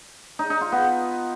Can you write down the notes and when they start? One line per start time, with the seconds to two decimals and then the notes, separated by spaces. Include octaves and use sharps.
0.39 D#4
0.50 D#4
0.61 F4
0.72 B3